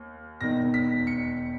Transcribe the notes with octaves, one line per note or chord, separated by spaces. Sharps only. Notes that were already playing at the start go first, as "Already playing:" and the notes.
Already playing: D#2
E1 E2 D#3 A#6
B6
C#7